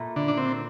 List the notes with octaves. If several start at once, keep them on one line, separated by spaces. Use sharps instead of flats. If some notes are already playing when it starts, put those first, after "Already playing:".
Already playing: A#2 A3 E4 A#4
D3
D4
C4